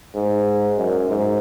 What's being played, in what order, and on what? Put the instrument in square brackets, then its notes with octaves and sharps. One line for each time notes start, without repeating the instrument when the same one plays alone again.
[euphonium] G#2
F#2
G#2